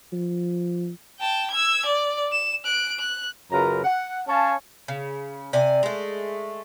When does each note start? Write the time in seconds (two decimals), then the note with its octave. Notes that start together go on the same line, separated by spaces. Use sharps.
0.12 F3
1.19 G5 A5
1.51 E6 G#6
1.86 D5
2.32 E7
2.65 F#6 D7
2.99 F#6
3.52 F#2 C#3 F4 A#4 B4 A#5
3.84 F#5
4.28 C#4 C#5 F5 G#5 A5
4.88 C#3
5.53 C3 D5 G#5
5.83 G#3 A3